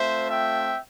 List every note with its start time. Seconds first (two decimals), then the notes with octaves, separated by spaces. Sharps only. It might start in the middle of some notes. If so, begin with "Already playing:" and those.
Already playing: A3 C4 F4 C5 E5
0.29 E5 G5